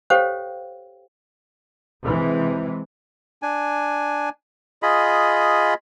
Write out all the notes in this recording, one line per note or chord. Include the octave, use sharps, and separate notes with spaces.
G4 A4 C5 C#5 F5 G5
C3 E3 G#3
D4 G#5
F4 G#4 D#5 B5